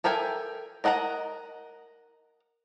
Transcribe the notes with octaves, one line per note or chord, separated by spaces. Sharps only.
A4 A#4 E5 G5 G#5
A#4 D#5 F#5 A5 A#5